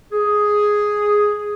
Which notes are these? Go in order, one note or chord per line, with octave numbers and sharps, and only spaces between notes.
G#4